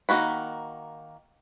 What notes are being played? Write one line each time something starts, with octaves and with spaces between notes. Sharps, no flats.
D#3 A#3 F#4 B5